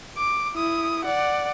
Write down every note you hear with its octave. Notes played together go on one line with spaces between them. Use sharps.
D6
E4 D#6
D5 F#5